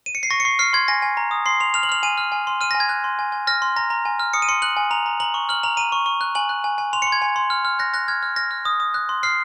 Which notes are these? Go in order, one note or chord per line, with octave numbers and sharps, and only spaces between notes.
D#7
C#7
C7
C#6 A#6
C#7
C#6 C7
F6 C7
C6 G#6
G#5 A#6
G#5
A#5
D#6
C6 C7
C6 F7
F6 F7
F#7
F6 F7
G#5 D#7
F6
G#5
C6
F6 D#7
A#6
G#5
G#6
F#6
C6
G#5
G#5
F6 A#6
C6
A#5 A#6
A#5
G#5
F6
D#6 C#7
D#7
C6 C#7
F#6 F#7
G#5
A#5 F7
A#5
A#5 F#7
C#6
F6 F#7
A#5 F7
A#5 D#7
C#6
C#6
F#6
G#5 F#7
F#6
G#5
G#5
C6 F7
C#7
C6
G#6
G#5
C6
F6
F6
F#6 A#6
F#6 A#6
F6 G#6
F6
F6 A#6
F6
D#6
D#6
F#6
C6
F6 C7